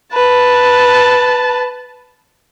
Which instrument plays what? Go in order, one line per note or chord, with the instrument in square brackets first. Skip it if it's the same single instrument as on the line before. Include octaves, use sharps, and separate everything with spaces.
[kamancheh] B4 A5